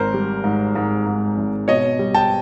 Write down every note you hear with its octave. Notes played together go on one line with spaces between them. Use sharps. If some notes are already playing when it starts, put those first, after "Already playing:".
Already playing: G#1 A#4 C5
G3
G#2
G#2
G#2
G#1
B2 C#5 D#5
G3
G5 A5